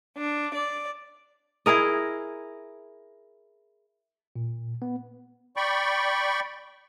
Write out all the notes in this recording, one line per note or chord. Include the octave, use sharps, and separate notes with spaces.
D4
D5
E4 G#4 A#4 D#5
A#2
B3
D5 G5 B5 C#6